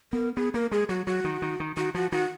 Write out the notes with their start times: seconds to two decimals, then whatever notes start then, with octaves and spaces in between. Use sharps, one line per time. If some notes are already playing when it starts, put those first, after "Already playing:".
0.13 B3 A#4
0.36 B3 G#4
0.54 A#3 A#4
0.71 G#3 G#4
0.89 F#3 F#4
1.07 F#3 F#4
1.24 D#3
1.42 D#3
1.60 D#3
1.77 D#3 F#4
1.94 F3 F#4
2.12 D#3 F#4